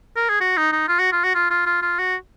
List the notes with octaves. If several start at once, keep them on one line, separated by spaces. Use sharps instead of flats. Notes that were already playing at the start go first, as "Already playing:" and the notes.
A#4
G#4
F#4
D#4
D#4
F4
F#4
F4
F#4
F4
F4
F4
F4
F#4